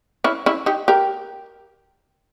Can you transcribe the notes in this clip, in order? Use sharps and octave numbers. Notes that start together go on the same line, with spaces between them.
C#4 E4
C#4 E4
D#4 G4
G4 A#4